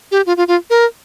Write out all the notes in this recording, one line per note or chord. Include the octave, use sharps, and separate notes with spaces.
G4
F4
F4
F4
A#4